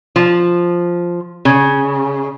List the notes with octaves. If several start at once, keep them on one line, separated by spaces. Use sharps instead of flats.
F3
C#3